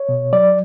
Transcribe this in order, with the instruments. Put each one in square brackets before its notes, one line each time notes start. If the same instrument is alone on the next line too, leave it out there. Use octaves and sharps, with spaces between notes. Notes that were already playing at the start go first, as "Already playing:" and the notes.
Already playing: [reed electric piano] C#5
B2
F#3 D5